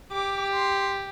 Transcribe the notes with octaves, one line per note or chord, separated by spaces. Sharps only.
G4 D6
C6